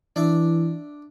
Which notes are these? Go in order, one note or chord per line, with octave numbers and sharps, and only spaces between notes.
E3 D4 E5